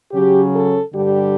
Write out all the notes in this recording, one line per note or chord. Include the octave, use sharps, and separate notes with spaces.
C#3 F#3 C#4 G4
A4
G2 D3 G3 G4